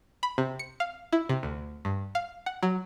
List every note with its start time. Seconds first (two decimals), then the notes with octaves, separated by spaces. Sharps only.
0.23 B5
0.38 C3
0.59 C#7
0.80 F5
1.12 E4
1.29 C3
1.43 D2
1.85 G2
2.15 F5
2.46 F#5
2.63 F#3